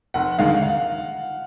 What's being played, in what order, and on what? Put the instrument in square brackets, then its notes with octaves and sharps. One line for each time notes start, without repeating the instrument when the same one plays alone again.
[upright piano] F1 [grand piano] F#5
[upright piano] D#2 D3 G#3 D#4 [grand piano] F5
[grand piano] F5